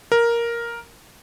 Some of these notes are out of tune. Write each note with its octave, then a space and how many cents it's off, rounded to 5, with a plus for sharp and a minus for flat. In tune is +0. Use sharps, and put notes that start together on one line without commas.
A#4 +5